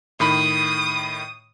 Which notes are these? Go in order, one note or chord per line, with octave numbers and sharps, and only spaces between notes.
A2 D#3 B5 D#6